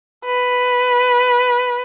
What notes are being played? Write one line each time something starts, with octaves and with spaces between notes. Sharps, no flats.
B4